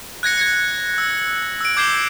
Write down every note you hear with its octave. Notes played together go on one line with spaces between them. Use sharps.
F#6 G#6 A#6 C#7
G#6 A#6 C#7
E6
E6 D7
D6 G6 G#6 C7 E7 G7